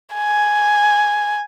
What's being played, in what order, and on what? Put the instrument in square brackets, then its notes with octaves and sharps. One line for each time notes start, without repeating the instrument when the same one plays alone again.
[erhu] G#5